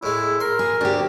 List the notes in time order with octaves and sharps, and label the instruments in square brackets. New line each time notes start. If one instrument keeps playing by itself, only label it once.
[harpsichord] A2 G#3 [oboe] E4
[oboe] A#4 [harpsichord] C6
[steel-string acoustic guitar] G#4
[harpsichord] D2 [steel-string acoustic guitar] D4 G4